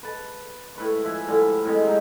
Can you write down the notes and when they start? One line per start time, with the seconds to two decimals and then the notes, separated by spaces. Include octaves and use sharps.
0.03 B4 A5
0.76 A2 B4 C#6
1.03 F3 E5 G#5
1.28 A2 D3 F3 G3
1.65 A2 C3 G#3
1.84 F3 F#3 D#4